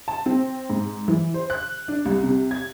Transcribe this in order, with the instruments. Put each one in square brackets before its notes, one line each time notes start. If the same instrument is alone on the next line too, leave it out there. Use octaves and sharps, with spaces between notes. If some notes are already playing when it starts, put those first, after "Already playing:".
[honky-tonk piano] A5
C4
G#2
E3
C5
F#6
D4
C2
C3
G#6